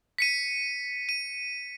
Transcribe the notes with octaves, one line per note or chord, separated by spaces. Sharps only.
B6 C#7 D#7
D#7